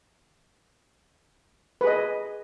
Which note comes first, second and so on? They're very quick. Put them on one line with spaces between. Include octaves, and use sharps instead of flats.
B4 G#4 D#5